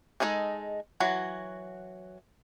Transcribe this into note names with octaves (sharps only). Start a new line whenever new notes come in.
G#3 A3 D#4 G#4 A4
E3 F#3 F#4